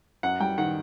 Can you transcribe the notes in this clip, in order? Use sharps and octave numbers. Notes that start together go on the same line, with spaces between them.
F#2 F#5
G3 G5
D#3 F#5